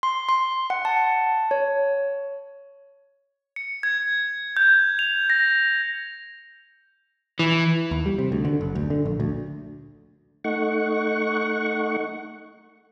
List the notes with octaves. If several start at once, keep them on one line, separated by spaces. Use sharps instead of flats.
C6
C6
F#5
A5
C#5
C#7
G#6
G6
F7
A#6
E3
D#2
G3
C3
D2
D3
F#1
D2
D3
A#1
D2
A3 D#4 F#5 C#6